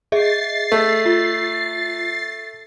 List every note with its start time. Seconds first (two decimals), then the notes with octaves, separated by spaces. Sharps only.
0.12 G#4 D#5 E5 A6 C7
0.72 A3
1.06 F4